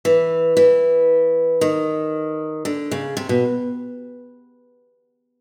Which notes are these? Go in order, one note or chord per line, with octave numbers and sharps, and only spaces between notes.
E3
E3
D#3
D3
C#3
C3
B2